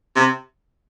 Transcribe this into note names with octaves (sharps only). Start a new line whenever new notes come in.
C3